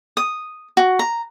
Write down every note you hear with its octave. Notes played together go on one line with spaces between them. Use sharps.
D#6
F#4
A#5